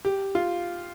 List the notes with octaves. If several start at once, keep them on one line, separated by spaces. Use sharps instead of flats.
G4
F4